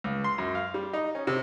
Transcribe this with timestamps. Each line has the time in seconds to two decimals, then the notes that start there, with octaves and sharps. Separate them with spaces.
0.04 C#2
0.24 C6
0.38 F#2
0.55 F5
0.74 G3
0.93 D#4
1.15 C#4
1.27 C3